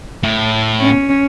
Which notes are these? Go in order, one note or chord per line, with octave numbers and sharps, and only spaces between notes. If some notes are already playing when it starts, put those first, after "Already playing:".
A2
C#4